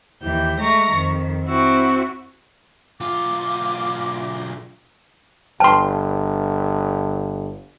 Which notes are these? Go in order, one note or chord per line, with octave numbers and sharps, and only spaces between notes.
D#2 E3 G4 G6
G#3 A3 A#5 C#6 A#6
F2 D#3
C4 E4 F#4 G4
B1 F4 D6
G1 B4 G5 A5 C6